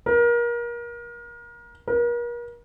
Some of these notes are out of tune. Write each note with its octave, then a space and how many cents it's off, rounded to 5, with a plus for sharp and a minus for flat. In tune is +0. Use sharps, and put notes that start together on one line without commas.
A#4 +30
A#4 +40